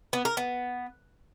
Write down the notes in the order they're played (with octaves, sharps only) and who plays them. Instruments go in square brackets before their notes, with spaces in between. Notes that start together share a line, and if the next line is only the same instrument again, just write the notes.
[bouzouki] B3
A#4
B3